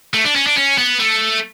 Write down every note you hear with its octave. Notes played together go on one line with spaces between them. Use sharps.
A3
D4
C#4
D4
C#4
B3
A3